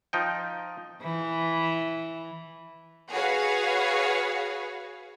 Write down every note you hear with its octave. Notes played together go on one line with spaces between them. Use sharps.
F3 D#4 G5
E3
F#4 G#4 B4 C#5 F5